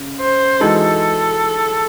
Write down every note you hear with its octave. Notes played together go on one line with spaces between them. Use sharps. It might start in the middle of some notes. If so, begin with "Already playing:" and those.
Already playing: C#3
C5
E3 G#3 D#4 F#4 A4